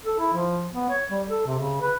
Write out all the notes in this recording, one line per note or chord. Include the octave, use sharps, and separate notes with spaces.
A4
E4
F3
B3
C#5
G3
A4
C3
C#3
B4